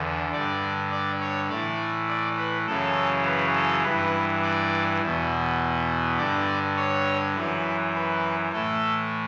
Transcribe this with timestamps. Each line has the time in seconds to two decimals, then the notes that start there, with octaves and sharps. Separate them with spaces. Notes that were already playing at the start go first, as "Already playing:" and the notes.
Already playing: E2 D3
0.32 G2 D3 D5
0.91 D5
1.20 C#5
1.49 A2 E3 D5
2.08 D5
2.38 B4
2.66 F#2 C#3 E3 A4
3.26 B4
3.55 A4
3.83 G2 E3 B4
4.42 D5
5.01 E2 B2
6.18 G2 D3 D5
6.77 C#5
7.35 F#2 E3 B4
7.95 B4
8.52 A2 E3 A4